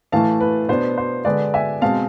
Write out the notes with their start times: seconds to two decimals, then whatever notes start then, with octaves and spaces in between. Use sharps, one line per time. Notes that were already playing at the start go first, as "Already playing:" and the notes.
0.12 A2 E3 A3 F5 A5
0.40 B4
0.68 B2 B3 D4 C5
0.98 C5
1.25 D3 G#3 D4 B4 D5
1.54 E5 G#5
1.81 B2 G#3 C4 F5 A5